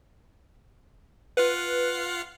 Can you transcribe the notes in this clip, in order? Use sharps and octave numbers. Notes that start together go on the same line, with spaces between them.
F4 B4 F5 F#5